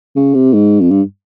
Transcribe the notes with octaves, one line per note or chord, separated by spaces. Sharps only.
C#3
C3
G#2
F2
G2